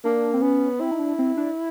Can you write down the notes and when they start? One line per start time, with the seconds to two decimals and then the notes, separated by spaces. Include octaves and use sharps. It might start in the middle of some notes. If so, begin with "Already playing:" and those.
0.04 A#3 D4
0.34 C4
0.42 B3 C#4
0.80 C4 E4
0.91 D#4
0.99 D4
1.19 C4
1.37 D4